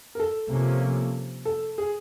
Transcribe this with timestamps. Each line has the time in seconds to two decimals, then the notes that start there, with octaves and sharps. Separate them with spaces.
0.15 A#4
0.20 A4
0.51 C3 F3 A#3 C#4
1.45 A4
1.78 G#4